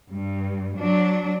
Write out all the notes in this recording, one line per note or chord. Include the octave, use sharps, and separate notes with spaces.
G2
F#3 D4